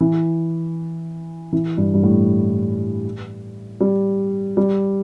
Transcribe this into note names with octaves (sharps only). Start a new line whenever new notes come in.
E3
E3
G2
G2
A2
G3
G3